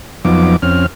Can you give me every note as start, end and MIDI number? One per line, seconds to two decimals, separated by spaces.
0.25 0.56 41
0.25 0.56 53
0.25 0.56 54
0.25 0.56 59
0.25 0.56 63
0.25 0.56 86
0.62 0.86 41
0.62 0.86 60
0.62 0.86 61
0.62 0.86 89